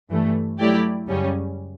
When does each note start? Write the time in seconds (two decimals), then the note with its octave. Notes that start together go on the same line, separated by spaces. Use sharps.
0.10 G2 E3 A3
0.59 F#3 A3 E4 G4 D5
1.08 F#2 C#3 G3 C#4